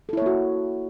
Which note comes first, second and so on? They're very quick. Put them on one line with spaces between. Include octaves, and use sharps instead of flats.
A4 E4 C#5 A#3 F#4